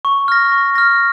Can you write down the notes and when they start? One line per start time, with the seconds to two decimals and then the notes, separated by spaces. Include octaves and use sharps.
0.05 C#6
0.28 F6 A#6
0.52 C#6
0.75 F6 A#6